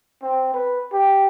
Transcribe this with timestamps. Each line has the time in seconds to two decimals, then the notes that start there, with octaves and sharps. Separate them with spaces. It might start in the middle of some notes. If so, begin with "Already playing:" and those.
0.22 C4
0.54 B4
0.93 G4